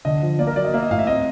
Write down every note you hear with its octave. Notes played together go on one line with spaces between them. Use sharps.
D3 D#5
F3
A#3 D5
A#4
F#3 D5
D#5
A#3 E5
D#5
A2 F5
E5
C4 D#5